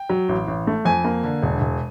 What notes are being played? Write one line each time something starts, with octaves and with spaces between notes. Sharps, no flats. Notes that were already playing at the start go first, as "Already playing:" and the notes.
Already playing: G5
F#3
A1
A1
A3
F2 G#5
A#3
D3
E1
E1